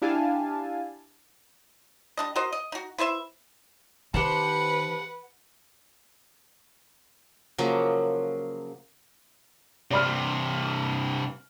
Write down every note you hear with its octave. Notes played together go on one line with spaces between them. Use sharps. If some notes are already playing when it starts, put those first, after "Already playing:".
D4 E4 G4 F5 G#5 A5
G3 D4 D#5
F#4 A#4 C5 D#5
D#5
D#4 F#4
E4 B4 C5 E5
D#3 G4 B4 C5 F#5 A5
C#3 F3 F#3 A#3
G2 C3 D5 B5 F6